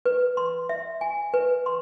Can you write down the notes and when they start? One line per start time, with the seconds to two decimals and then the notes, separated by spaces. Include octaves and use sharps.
0.05 B4
0.37 C6
0.69 E5
1.01 G#5
1.34 B4
1.66 C6